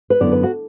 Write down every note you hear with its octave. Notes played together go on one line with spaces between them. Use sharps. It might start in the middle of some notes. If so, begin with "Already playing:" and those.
B4
F#2 D3 B3 E4 D5
B4
F#4